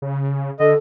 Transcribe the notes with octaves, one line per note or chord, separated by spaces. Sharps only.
C#3
D3 A4 D#5